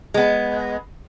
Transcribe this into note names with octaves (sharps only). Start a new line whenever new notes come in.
G#3 B3